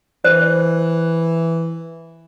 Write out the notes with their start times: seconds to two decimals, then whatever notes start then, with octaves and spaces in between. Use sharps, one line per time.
0.24 E3 C5